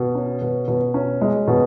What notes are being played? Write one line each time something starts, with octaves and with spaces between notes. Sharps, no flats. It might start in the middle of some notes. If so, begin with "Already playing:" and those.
Already playing: B2
C#4
B2
B2
C#4
G#3
B2